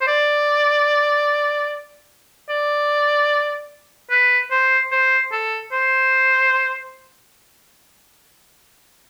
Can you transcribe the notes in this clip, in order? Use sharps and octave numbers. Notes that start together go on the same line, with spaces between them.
C5
D5
D5
B4
C5
C5
A4
C5